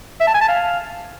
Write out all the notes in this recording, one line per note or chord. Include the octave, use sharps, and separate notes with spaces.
E5
A5
G#5
A5
F5